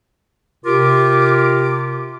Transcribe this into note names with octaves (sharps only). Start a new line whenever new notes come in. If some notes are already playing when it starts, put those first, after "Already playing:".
C3 F4 G4 A#4 D6